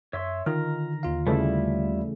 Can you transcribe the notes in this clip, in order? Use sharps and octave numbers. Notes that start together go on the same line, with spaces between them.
F#2 C#5 E5 C6
D3 D#3 F4 A#5 F6
D#2 F4 F5
C#3 E3 G3 A3 E4